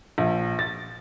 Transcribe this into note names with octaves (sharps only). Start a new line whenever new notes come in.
A#1
A6